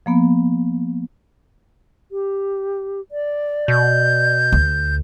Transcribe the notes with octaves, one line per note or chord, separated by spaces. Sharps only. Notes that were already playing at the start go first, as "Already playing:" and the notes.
F3 A#3 B3
G4
D5
B2 G6
D2